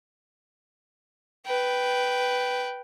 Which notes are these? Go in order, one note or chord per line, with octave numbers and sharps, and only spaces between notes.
B4 G5